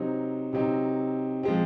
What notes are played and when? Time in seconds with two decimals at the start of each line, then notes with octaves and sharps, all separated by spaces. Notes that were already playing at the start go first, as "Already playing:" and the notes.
Already playing: C3 F#3 C4 D#4 C5
0.53 C3 F#3 C4 D#4
1.43 F3 G#3 C4